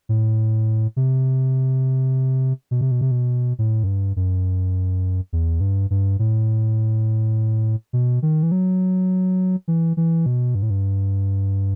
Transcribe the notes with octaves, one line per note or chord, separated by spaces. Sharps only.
A2
C3
B2
C3
B2
C3
B2
A2
F#2
G2
F#2
E2
G2
G2
A2
B2
D#3
E3
F#3
E3
E3
B2
G2
A2
G2